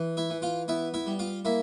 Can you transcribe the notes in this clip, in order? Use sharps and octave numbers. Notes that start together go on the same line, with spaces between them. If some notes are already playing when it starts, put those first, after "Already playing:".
Already playing: E3
E4 E5
E3
F4 F5
B3 E4 E5
E4 E5
G3
F4 F5
A#3 E4 E5